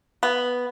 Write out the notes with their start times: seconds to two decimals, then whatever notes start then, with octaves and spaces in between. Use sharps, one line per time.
0.23 B3